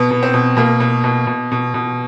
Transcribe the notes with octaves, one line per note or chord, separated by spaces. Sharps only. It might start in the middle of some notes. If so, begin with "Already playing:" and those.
Already playing: B2 B3
B2
C4
B2
B2 A#3
B2
B2
B2
B2
B2